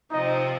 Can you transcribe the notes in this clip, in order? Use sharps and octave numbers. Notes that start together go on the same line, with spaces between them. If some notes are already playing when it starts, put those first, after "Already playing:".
C3 F3 C4 D#4 D#5